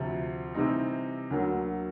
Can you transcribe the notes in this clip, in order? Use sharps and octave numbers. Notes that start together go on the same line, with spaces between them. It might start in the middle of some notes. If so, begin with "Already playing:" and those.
Already playing: D2 C3 F3
C3 E3 G3 C4 D#4
D2 D3 F#3 A#3